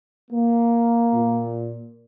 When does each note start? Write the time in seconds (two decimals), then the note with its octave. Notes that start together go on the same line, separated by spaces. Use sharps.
0.31 A#3
1.14 A#2